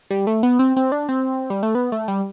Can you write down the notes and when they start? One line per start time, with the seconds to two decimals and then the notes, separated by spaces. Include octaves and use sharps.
0.10 G3
0.27 A3
0.43 B3
0.59 C4
0.77 C4
0.92 D4
1.09 C4
1.50 G3
1.63 A3
1.75 B3
1.92 A3
2.08 G3